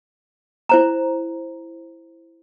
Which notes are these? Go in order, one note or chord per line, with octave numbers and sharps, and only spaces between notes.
E4 C5 A#5